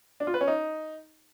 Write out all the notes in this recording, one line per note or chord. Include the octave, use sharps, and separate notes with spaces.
D4
F4
B4
C#4
D#4